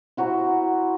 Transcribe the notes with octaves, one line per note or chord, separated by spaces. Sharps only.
E4 F#4 C5 A#5